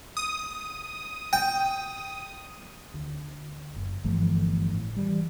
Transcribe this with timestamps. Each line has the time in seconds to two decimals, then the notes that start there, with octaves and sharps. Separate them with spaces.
0.17 D#6
1.33 G5
2.94 D2
3.76 F#1
4.04 G1 E3 F3 A3
4.73 A2
4.96 E3 G3